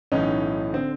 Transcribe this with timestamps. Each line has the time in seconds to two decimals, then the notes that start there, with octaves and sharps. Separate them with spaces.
0.12 B1 A2 E3 C#4 D#4
0.73 D3 C4